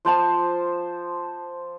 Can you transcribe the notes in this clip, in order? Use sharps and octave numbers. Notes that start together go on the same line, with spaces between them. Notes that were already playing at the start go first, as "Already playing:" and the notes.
F3 C5 A5 C6